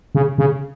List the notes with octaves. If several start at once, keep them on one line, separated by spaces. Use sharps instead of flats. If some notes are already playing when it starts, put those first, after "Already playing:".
C#3
C#3